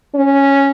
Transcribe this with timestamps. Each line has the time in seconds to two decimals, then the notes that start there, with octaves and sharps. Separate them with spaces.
0.15 C#4